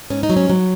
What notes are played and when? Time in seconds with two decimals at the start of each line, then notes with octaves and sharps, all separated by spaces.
0.10 G#2 C#4
0.23 D#4
0.29 F#3
0.37 C#4
0.50 F#3